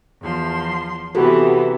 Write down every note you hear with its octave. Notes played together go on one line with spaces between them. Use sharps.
E2 F3 C6
C3 E3 B3 F#4 G4 A4